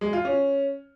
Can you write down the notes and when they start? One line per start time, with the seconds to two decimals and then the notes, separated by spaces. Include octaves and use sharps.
0.01 G#3
0.13 F4
0.25 C#4